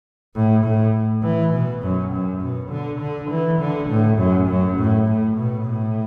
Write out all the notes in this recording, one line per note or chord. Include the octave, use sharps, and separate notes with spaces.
A2
A2
E3
B2
F#2
F#2
B2
D3
D3
E3
D3
A2
F#2
F#2
A2
A2
B2
A2